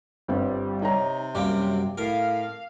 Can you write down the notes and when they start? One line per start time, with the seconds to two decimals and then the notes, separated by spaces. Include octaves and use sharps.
0.28 G1 G3 C4
0.82 C3 D#4 C#5 A#5
1.35 F#2 G3 A#3 D6
1.98 A2 A#4 F5